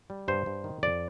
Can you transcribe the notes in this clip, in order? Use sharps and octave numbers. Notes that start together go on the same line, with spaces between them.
G3
G2 C5
G2
D#3
F2 D5